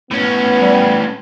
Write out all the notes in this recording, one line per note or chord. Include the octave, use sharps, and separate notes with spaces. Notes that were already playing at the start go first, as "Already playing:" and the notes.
A2 B3 C#4
G3